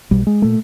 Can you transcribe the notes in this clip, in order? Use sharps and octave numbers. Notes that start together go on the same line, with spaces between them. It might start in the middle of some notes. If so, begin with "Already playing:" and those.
B1 B2 G3
G#3
A#2 A3